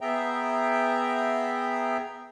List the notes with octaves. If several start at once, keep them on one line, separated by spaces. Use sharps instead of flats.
B3 G#4 E5 G5 A#5